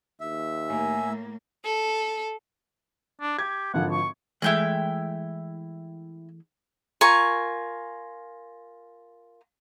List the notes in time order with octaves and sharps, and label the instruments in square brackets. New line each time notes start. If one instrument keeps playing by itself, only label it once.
[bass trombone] D#2 [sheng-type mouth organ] E5
[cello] A2 A#3 [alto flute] G#5
[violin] A4
[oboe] D4
[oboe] G4 [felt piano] G#6
[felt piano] G#1 D3 F3 [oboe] F#5
[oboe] C#6
[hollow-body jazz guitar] E3 G#3 A3 [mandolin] E4 G5 F#6
[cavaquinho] F4 A#4 G#5 C#6